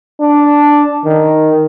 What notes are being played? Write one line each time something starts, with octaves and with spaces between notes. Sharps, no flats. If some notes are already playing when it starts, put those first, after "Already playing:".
D4
D#3